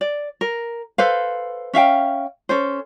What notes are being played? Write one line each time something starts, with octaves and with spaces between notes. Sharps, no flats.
D5
A#4
A4 B4 C5 F5
C#4 E5 F5 G5
C#4 A4 C5